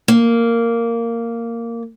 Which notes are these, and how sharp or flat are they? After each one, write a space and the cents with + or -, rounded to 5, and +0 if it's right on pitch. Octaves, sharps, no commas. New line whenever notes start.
A#3 -10